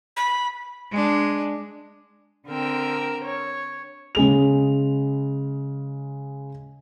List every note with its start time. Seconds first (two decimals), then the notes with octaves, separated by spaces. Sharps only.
0.16 B5
0.92 G#3 D4
2.48 D3 C4 A#4 G5 E6
3.25 C#5
4.15 C#3 G#3 F7